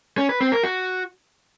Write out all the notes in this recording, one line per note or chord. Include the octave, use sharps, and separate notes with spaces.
C#4
B4
C4
A#4
F#4